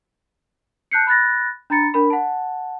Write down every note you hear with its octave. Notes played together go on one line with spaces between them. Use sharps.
A5 F#6 G6 C7 C#7
B5 F#6 A6 A#6
D4 A#5 B5 A6 C#7
D4 A#4 B5
F#5 A5